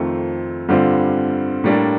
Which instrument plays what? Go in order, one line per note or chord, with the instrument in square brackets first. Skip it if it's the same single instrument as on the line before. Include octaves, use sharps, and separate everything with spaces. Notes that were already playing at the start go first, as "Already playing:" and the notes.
Already playing: [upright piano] F2 D#3 A3 C4 F4
G2 D3 G3 C4 F4
A2 G3 A#3 D4